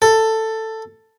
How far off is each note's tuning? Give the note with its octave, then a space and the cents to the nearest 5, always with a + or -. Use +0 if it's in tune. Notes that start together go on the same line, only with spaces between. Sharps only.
A4 +10